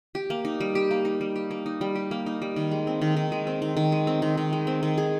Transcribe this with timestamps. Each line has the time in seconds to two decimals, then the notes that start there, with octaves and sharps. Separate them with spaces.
0.15 G4
0.30 A#3
0.45 D#4
0.60 G3
0.75 G4
0.91 A#3
1.05 D#4
1.21 G3
1.36 G4
1.51 A#3
1.66 D#4
1.81 G3
1.95 G4
2.11 A#3
2.26 D#4
2.42 G3
2.56 D#3
2.71 G#3
2.87 C4
3.01 D#3
3.16 D#3
3.32 G#3
3.47 C4
3.62 D#3
3.77 D#3
3.92 G#3
4.07 C4
4.22 D#3
4.37 D#3
4.53 G#3
4.67 C4
4.83 D#3
4.98 G#4